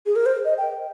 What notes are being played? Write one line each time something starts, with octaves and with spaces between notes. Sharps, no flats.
G#4
A#4
C5
D#5
G5